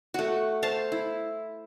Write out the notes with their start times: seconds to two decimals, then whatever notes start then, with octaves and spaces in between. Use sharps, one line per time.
0.14 A3 F#4
0.62 C5 F5 A5
0.92 E4